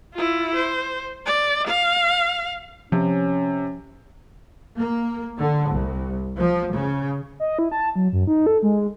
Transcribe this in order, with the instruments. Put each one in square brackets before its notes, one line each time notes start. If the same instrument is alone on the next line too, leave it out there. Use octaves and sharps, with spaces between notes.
[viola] E4 F4
C5
D5
F5
[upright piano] C3 [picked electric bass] F3 [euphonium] C#4
[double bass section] A#3
D3
C2
F3
C#3
[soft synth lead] D#5
E4
A5
F#3
F#2
D#4
A4
G#3